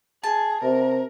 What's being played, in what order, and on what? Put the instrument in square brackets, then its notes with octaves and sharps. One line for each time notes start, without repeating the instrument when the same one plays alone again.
[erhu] G#4 [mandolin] A5
[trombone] C3 [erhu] A#4